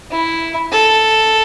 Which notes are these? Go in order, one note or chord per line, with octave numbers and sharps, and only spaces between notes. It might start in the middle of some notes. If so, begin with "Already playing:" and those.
E4
A4